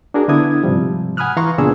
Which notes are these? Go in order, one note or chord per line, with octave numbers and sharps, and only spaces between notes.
D4 F#4 G#4 A#4
D3 B3 D4 E4 D#6 G#6
G#2 C3 F3 G3
F#5 G#5 B5 D#6 F6 F#6
E3 F5 A#5 C6 C#6
C#2 A#2 B3 D4 G#4 E6